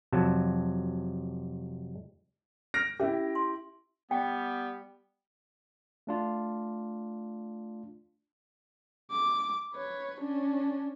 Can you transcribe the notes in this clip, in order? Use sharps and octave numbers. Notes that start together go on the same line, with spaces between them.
F2 C3 F#3 A5
F6 A#6 D7
C#4 E4 G4 E5
C6
G3 B3 G5
A3 D4 F4
D6
B4 C#5
C#4 D4